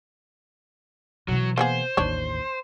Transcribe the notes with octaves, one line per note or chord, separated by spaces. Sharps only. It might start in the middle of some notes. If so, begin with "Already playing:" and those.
B2 E3 F#3
A#3 B3 G#4 C5
A1 D#2 D4 C#5